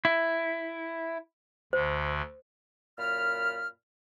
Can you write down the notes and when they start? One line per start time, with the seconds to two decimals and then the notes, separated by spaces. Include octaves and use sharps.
0.05 E4
1.73 D2 D3 C5
2.98 F#2 A#2 B5 F6